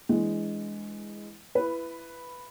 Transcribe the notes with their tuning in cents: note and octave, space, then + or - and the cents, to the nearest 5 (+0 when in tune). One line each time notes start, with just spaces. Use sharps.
E3 +0 G#3 +0 D4 -15
E4 +20 B4 +0